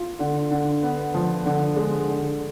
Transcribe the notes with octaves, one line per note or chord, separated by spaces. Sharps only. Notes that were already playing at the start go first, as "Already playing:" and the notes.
Already playing: F4
D3
D3
B3
F3
D3
G#3
D3